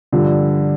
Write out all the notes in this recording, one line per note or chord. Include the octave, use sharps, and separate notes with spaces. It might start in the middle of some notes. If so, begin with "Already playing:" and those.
G2 D3 F3